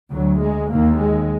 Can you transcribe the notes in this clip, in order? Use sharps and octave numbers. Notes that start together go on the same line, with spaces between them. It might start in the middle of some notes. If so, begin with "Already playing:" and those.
D2 F#3
G#3
D#2 A#3
G#3